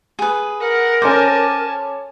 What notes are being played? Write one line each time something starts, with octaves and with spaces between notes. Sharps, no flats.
G#4 B4
A#4 F#5
C#4 A4 C5 G#5 A5 D6